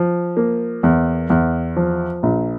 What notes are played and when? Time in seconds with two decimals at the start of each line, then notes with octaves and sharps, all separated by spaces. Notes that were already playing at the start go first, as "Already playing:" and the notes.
Already playing: F3
0.37 A#3
0.83 E2
1.30 E2
1.77 F3
2.23 A#1